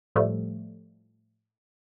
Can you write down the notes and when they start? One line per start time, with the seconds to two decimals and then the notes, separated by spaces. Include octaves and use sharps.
0.16 A2 F3 G3 A3